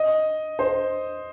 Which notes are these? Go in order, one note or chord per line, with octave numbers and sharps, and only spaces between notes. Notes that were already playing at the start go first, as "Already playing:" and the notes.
Already playing: D#5
C5